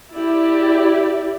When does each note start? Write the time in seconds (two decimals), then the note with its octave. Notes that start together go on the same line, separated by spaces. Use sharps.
0.14 E4 G4 D5